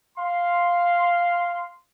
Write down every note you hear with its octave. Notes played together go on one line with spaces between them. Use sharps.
F5 C6